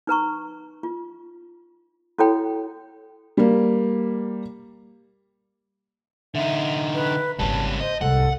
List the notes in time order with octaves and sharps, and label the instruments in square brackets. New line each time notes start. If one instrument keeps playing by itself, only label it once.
[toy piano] D#4 B4 A#5 C#6
F4
E4 F#4 A4 C#5 G5 B5
[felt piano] G3 A#3
[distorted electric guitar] D3 D#4 [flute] E5
[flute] B4
[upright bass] G#1 C#3 [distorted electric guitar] G3 C#4 [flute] A5
[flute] C5 [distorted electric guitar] D#5
[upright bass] C2 G#2 [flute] A4 [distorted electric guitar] F#5